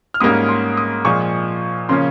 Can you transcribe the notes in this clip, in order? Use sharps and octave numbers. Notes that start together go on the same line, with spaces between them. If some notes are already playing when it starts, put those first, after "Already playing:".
F6
G#2 G3 A#3 C#4 D#6
C6
D#6
A#2 F3 G#3 C#6
C#3 F3 A#3 C#4 C6